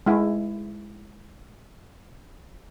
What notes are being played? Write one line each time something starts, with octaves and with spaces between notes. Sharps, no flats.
G#3 E4